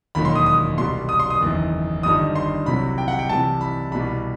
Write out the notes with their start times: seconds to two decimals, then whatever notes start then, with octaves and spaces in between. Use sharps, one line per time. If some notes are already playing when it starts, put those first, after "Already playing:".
0.15 E1 D#2 D#3 F#3 B5
0.25 C6
0.35 D#6
0.46 D#6
0.77 C2 B2 G3 C6
1.09 D#6
1.20 C6
1.30 D#6
1.41 F#1 E2 D#3
2.03 G1 G2 D#3 G3 D#6
2.36 C6
2.66 C2 C3 F#3 B5
2.98 G5
3.08 F#5
3.19 G5
3.29 C2 C3 E3 G3 A5
3.61 B5
3.92 C2 B2 G3 B5